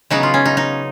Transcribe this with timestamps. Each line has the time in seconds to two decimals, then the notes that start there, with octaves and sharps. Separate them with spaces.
0.10 C#3 F#3 B3 D#4
0.23 F4
0.34 C#4
0.45 D#4
0.57 D#4